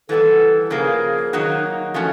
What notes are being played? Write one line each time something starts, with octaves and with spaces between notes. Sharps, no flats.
E3 G3 B3 E4 A4
C#3 F3 A#3 G#4
D#3 F#3 A#3 D#4 F#4
F3 A3 C#4 F#4